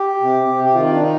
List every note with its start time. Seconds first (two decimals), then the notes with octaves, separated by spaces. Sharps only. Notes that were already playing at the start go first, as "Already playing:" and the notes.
Already playing: G4
0.21 C3
0.47 C3
0.64 G4
0.75 D#3 F4
0.93 D4
1.01 D#4